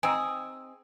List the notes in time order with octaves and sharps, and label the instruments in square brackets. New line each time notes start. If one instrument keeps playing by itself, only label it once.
[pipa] C4 D#4 G#4 [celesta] G#5 E6